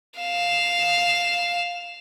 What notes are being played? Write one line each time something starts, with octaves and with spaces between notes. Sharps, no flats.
F5 E7